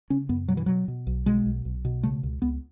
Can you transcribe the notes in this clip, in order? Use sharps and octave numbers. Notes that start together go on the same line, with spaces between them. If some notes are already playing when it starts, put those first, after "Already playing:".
C#3 C#4
F#2 B3
B2 F#3
E3
B2 F#3
B2
B1
B2 G#3
B1
B1
B2
C#3 A3
C#2
C#2 B3